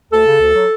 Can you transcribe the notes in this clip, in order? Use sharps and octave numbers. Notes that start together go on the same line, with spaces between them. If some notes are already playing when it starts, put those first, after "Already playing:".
D2 A4
C#3
D2
F#3